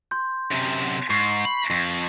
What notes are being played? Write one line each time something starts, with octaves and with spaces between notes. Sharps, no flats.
C6 G6
F#2 C3
G#2 C#6 C7
B5
F2